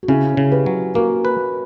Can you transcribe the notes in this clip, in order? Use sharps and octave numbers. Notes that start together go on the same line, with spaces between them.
F#4
C#3 C#4 E4
C#3
G4 B4
F#3
A#3 F#4 A#4
B4